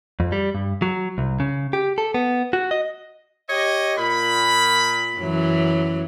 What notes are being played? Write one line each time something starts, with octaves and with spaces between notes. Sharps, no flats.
F2
G3
G2
F#3
C2
C#3
G4
A4
B3
F#4
D#5
G4 C#5 D#5
A#2 B5
F#2 E3 F#3